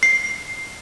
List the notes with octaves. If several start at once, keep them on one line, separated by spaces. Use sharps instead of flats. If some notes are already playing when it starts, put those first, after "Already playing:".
C7